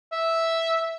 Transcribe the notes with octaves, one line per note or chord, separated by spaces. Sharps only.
E5